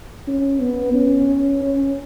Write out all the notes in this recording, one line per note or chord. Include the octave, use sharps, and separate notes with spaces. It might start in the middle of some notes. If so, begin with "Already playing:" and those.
C#4
B3
C#4
C#4